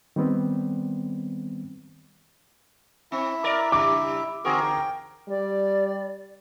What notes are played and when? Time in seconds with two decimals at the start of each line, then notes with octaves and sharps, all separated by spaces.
0.16 D#3 G3 B3 C4
3.12 C4 E4 E5
3.44 A#4 D5
3.72 C#3 G3 D6
4.45 D3 C4 F#4 G#4 A#4
4.64 G5
5.29 G3 D5